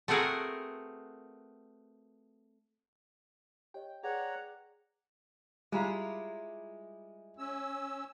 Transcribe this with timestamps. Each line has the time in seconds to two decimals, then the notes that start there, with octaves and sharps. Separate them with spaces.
0.08 A3 C4 F#4 G#4 A#4 B4
3.74 G4 C#5 D#5 G5
4.03 G#4 B4 C#5 D5 F#5 A#5
5.72 G3 G#3 E4 F4 A#5
7.38 C#4 E6